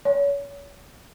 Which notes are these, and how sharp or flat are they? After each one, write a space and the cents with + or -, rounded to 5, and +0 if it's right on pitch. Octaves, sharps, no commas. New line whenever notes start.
C#5 +30